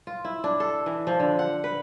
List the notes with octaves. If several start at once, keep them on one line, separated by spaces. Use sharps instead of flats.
F4
E4
D4
A4
E3
F3
D3
F#5
B4